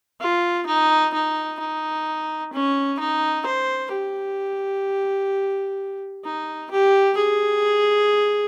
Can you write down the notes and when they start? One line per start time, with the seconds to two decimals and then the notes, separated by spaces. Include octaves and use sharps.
0.21 F4
0.67 D#4
1.14 D#4
1.60 D#4
2.53 C#4
2.99 D#4
3.46 C5
3.92 G4
6.24 D#4
6.71 G4
7.17 G#4